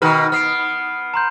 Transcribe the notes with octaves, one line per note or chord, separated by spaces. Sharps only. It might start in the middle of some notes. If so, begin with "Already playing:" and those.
B2 D#3 B4 F6
B3 F6 C7 D7
A#5 C6 G6